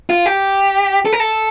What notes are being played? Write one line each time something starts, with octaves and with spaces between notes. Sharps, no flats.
F4
G4
A4
A#4
A4